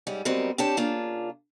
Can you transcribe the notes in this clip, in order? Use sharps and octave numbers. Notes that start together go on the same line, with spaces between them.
G#2 G3 C#4
F#2 G3 B3 C4 A#4 D#5
C4 D4 G4 C#5 A5
C#3 A#3 D4 F4